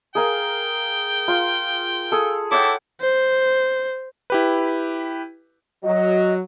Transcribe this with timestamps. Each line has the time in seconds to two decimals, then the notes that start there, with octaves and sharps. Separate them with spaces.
0.15 G#4 A#4 F5 G5
1.28 F4 C6
2.12 G#4 A4
2.52 E4 A4 C#5 F#5 G5 D6
3.01 C5
4.30 E4 G4 B4
5.84 F#3 D#5